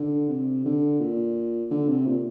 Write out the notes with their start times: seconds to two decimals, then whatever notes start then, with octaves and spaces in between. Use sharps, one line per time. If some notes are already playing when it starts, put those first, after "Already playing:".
Already playing: D3
0.29 C3
0.65 D3
1.00 A#2
1.71 D3
1.88 C3
2.06 A#2